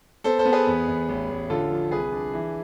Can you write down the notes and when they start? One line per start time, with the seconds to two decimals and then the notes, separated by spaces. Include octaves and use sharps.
0.24 B3 A4 C5
0.39 A4 C5
0.45 B3
0.52 G#4 B4
0.67 E2
0.88 E2
1.08 A1
1.29 A1
1.50 D3 F4 A4
1.71 F3
1.91 C2 G#4 B4
2.12 D4
2.33 E3